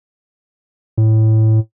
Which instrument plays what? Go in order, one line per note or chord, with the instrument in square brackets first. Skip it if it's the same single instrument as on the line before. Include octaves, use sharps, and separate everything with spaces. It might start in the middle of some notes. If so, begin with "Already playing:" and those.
[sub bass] A2